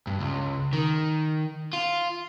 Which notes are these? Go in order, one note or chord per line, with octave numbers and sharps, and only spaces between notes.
G2
C#2
D#3
F4